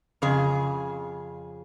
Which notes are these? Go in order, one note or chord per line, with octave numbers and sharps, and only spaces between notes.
F2 C#3 G#4